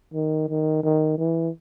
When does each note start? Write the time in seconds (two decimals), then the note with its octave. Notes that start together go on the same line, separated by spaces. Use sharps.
0.14 D#3
0.49 D#3
0.83 D#3
1.18 E3